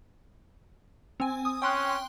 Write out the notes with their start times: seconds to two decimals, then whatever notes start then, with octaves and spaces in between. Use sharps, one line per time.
1.20 C4 G#5
1.45 D#6
1.62 C#4 G5 C6 F#6